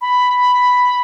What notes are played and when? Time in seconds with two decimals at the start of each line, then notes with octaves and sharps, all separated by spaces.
0.01 B5